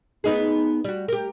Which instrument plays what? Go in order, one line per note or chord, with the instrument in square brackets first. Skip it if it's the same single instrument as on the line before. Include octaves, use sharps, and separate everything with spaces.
[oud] B3 D#4 G#4
G3 F#4
G4 A#4